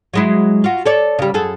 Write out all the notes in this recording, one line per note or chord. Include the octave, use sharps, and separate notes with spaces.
F#3 G#3 E4
F4 F#4
A4 C#5 D5
C#3 G3
F#2 G#4 A4